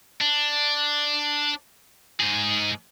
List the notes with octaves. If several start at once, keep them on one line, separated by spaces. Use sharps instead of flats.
D4
G#2 G#4